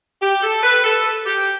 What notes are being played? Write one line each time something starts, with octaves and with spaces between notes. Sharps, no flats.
G4
A4
B4
A4
G4